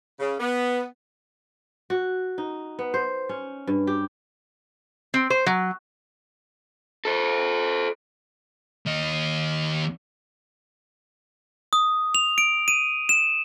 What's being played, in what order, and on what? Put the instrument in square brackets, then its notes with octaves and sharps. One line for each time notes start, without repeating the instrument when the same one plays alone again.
[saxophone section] C#3
B3
[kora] F#4
D#4
B3
C5
C#4
G2
G4
[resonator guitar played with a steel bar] C4
C5
F#3
[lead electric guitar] A4 C5
[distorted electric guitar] D#2 D#5
[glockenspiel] D#6
F7
D7
D#7
E7